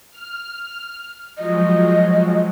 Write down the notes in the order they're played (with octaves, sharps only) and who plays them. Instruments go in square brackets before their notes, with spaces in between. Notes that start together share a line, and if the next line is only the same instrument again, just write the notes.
[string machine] F6
[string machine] F3 F#3 G#3 [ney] D#5